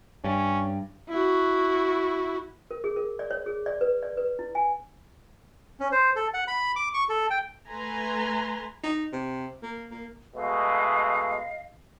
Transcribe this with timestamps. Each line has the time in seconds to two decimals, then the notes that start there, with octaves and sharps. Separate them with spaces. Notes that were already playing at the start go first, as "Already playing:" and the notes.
0.24 G2 C#4
1.09 E4 F#4
2.71 A#4
2.84 G#4
2.96 A#4
3.19 D5
3.31 C#5
3.46 G#4
3.66 D5
3.81 B4
4.03 D5
4.17 B4
4.39 E4
4.55 G#5
5.80 C#4
5.92 C5
6.16 A4
6.34 F#5
6.48 B5
6.76 D6
6.94 C#6
7.09 A4
7.30 G5
7.68 A3 B4 G#5 A#5 C6
8.84 D#4
9.12 C3
9.62 A#3
9.91 A#3
10.36 B2 G#3 A3 D#5 F5